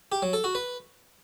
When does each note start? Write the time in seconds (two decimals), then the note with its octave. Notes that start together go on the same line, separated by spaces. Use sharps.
0.12 G4
0.22 F#3
0.33 A4
0.44 F#4
0.55 B4